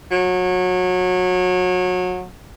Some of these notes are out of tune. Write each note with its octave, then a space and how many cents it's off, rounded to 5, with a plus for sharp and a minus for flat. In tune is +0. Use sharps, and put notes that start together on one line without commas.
F#3 -25